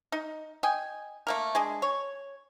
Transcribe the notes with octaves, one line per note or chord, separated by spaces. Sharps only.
D#4
D#5 G5 G#5
A3 A#3 A#4
G#3 D4 G#4
C#5